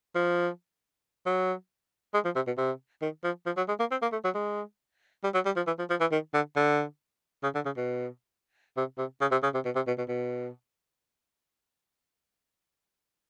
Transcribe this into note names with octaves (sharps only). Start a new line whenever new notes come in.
F3
F#3
G#3
F3
C3
B2
C3
D#3
F3
F3
F#3
G#3
A#3
C4
A#3
A3
F#3
G#3
G3
F#3
G3
F3
E3
F3
F3
E3
D#3
D3
D3
C#3
D3
C#3
B2
C3
C3
C#3
C3
C#3
C3
B2
C3
B2
B2
B2